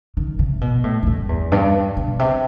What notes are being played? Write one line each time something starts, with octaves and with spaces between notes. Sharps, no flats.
D#3
C3
B2
A2
A2
G2
E2
G2
B2
C3